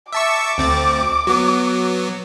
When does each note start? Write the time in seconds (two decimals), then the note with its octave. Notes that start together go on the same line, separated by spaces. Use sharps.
0.13 E5 A5 C#6 D6
0.58 D2 C4 A6
1.27 F#3 B3